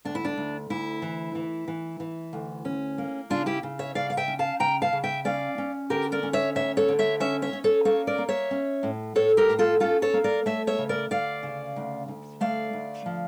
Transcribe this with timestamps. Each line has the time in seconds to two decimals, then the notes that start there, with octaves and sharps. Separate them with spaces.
0.05 D2 D4
0.15 E4
0.25 D4
0.37 D2
0.70 D2 E4
1.02 E3
1.35 E3
1.68 E3
2.00 E3
2.33 D2
2.65 C#4
2.98 A#3
3.30 C#3 D4 F4
3.46 E4 G4
3.63 C#3
3.79 C#5 E5
3.95 C#3 D5 F5
4.10 F5
4.17 E5 G5
4.28 C#4
4.39 F5 A5
4.60 C#3 G5 A#5
4.82 F5 A5
4.93 C#3
5.04 E5 G5
5.25 C#4 D5 F5
5.58 C#4
5.90 D3 G4 A#4
6.12 A#4 D5
6.23 C#4
6.33 C#5 E5
6.55 D2 C#5 E5
6.77 A4 C#5
6.88 D3
6.99 C#5 E5
7.20 C#4 C#5 E5
7.42 C#5 E5
7.53 C#4
7.64 A4 C#5
7.85 A#3 A4 C#5
8.07 A#4 D5
8.18 A#3
8.29 C#5 E5
8.51 C#4
8.83 A2
9.16 A2 A4 C#5
9.37 G4 A#4
9.48 A2
9.59 F4 A4
9.80 C#4 F4 A4
10.02 A4 C#5
10.14 A#3
10.24 A#4 D5
10.46 A3 C#5 E5
10.67 C#5 E5
10.78 C#3
10.89 A#4 D5
11.11 D2 D5 F5
11.43 C#3
11.76 D2
12.08 D2
12.41 A3 D5 F5
12.73 D2
13.06 F3